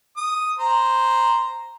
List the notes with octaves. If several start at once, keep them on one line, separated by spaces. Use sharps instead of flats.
D#6
C5 A#5